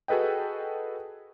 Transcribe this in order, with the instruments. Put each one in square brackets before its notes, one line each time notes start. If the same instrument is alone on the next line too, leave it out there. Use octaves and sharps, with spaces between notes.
[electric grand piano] F#4 G#4 A4 B4 D#5 G5